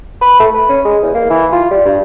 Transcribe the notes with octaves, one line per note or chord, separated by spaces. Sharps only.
B4
A3
B4
C#4
G#3
E2
A#3
E3
F4
G3
G2